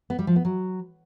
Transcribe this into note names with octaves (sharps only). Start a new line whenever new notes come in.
B3
G3
F3
B3
F#3